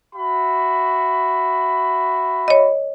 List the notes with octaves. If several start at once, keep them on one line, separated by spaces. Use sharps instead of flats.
F#4 E5 B5
C#5 D#5